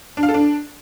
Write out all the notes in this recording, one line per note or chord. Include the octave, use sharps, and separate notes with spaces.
D4
F5
A4
D4